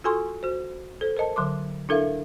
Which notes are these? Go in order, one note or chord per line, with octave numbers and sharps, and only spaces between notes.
F4 F#4 A4 G#5 C6 C#6
F#4 C5
A4 C5
A#4 C5 D#5 A5
D3 F#3 C6 D6
D4 E4 A4 A#4 E5 F5